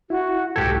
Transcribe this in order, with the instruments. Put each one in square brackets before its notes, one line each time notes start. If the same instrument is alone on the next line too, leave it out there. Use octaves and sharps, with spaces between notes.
[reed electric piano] E4 [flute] F#4
[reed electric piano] C2 G#2 G#6 [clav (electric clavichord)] F#4 G4 A4 [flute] G5